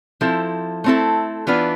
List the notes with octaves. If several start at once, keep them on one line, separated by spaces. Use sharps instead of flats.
F3 C4 E4 A4
A3 C4 E4 A4
E3 B3 D4 F4 B4